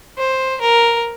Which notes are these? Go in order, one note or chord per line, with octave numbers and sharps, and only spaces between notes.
C5
A#4